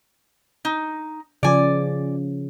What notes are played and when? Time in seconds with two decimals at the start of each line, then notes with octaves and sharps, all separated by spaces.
0.65 D#4
1.43 C#3 F3 D5 G#5